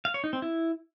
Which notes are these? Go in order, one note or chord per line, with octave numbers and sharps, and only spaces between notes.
F5
C#5
D#4
C4
E4